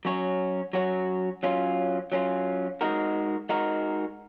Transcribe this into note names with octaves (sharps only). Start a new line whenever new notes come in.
F#3 C#4 F#4 C#5
F#3 C#4 F#4 C#5
F#3 C#4 F4
F#3 C#4 F4
G#3 D#4 F#4 A#4
G#3 D#4 F#4 A#4